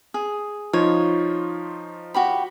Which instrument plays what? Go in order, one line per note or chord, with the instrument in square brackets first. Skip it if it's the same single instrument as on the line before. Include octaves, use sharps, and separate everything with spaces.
[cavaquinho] G#4
[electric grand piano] F3 D#4 F4 [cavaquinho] C#5
[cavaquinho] F#4 G4 B5